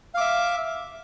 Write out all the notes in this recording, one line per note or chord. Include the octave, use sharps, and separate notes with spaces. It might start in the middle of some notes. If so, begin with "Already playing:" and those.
E5 F5 D6